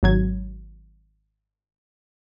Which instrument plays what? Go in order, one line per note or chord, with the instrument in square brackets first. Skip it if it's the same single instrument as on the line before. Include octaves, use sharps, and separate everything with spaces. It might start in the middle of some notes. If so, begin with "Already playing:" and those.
[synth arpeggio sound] G#1 F#3 G#6